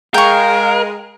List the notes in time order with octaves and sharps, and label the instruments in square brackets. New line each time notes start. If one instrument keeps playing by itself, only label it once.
[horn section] G#3 [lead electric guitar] A#4 [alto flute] F5 [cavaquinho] G5 C#6